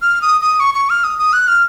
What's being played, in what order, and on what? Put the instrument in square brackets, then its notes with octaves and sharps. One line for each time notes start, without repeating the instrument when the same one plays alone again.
[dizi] F6
D#6
D#6
C#6
C#6
F6
D#6
D#6
F#6
F6